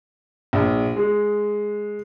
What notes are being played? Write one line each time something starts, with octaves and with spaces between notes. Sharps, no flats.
A#1
G#3